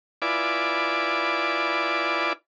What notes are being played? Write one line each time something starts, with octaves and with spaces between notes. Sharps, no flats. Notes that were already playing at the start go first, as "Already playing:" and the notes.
E4 F4 B4 D5 G#5 D6